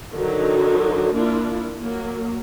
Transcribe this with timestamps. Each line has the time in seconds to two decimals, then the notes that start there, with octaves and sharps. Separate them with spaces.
0.13 D3 D#3 F#3 D#4
1.14 A#3 D4 E4 F4
1.79 F#3 A#3